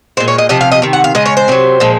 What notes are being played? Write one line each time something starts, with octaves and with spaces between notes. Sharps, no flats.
A#2 G#3 C5
C#5
D#5
C3 F3 D#5
F5
D#5
C3 D#3
F#5
F5
C#3 G#3 D#5
C#5
C5
C3 D#3 F#3
A#2 F3 G#3